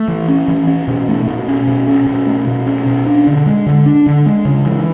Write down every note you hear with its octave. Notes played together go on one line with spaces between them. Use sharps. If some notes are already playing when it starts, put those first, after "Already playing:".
Already playing: A3
E3
C#4
E3
C#4
B2
A3
B2
C#4
B2
C#4
B2
A3
B2
C#4
B2
D4
D3
G#3
D3
D4
D3
G#3
C#3
E3